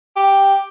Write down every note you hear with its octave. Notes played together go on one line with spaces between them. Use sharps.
G4